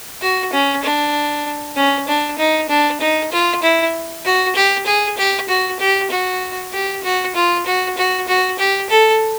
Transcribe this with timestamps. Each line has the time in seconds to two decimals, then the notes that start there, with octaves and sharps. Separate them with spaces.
0.22 F#4
0.53 C#4
0.83 D4
1.76 C#4
2.08 D4
2.38 D#4
2.69 D4
3.01 D#4
3.32 F4
3.62 E4
4.25 F#4
4.55 G4
4.86 G#4
5.17 G4
5.48 F#4
5.79 G4
6.10 F#4
6.72 G4
7.03 F#4
7.35 F4
7.66 F#4
7.97 F#4
8.28 F#4
8.59 G4
8.90 A4